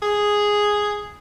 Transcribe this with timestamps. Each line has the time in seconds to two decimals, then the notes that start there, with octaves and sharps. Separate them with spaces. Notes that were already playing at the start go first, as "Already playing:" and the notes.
0.02 G#4